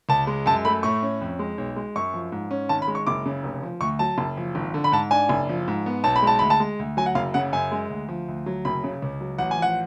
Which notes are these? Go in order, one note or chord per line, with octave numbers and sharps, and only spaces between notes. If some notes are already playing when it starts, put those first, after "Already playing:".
C#2 A5
G#3
F#2 A5
A3 B5
A2 C#6
C#4
F2
G#3
B1
G#3
F#2 C#6
F3
G#2
C#4
G#1 A5
B5
G#3
C#6
F#1 D6
C#3
F1
F3
D2 C#6
F#3 A5
F#1
F3
G#1
D3
B5
G#2 A5
D4 G#5
F#1
F3
G#2
B3
B1 A5
B5
G#3 A5
D2 B5
A5
G#3
D2
F#3 G#5
F#5
F#1 F5
C#3 F#5
F#2 G#5
G#3
D2
F3
D2
F#3
F#1 B5
C#3
C#2
F#3
A1 F#5
G#5
F3 F#5